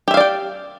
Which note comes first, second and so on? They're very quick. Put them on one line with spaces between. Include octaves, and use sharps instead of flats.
G4 E5 F5 D5 G5